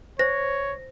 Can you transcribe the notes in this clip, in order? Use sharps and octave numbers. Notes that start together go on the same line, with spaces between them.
C5 C#5 A#6